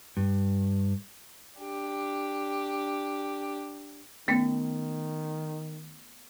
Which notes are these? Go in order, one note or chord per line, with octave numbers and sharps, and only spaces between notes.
G2
D4 G4
D#3 A3 B3 C#4